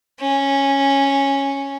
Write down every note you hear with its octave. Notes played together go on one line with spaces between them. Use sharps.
C#4